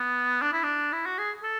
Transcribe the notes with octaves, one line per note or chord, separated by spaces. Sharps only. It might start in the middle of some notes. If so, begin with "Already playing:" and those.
Already playing: B3
D4
E4
D4
E4
F#4
G#4
A4